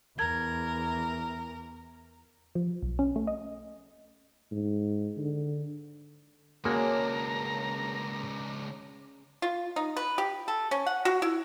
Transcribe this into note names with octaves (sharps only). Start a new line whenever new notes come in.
E2 A#4 G#6
F3
B1
C#4
A3
D#5
G#2
D3
C#2 C#3 G#3 A#3 D4 F#4 A#5
F4
D#4
B4
G4
A4
C#4
F#5
F#4
E4